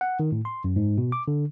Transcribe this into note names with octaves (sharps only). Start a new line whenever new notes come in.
F#5
D#3
A2
C6
F#2
G#2
B2
D6
D3